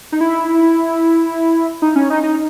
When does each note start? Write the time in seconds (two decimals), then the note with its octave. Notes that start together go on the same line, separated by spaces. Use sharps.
0.12 D#4
0.21 E4
1.82 D#4
1.96 C#4
2.10 D#4
2.23 D#4